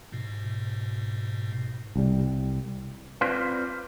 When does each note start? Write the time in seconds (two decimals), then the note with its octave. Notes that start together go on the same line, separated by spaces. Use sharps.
0.12 G#2 B2
1.96 C2 G3
3.21 C4 F4 B4 C5 D5 F5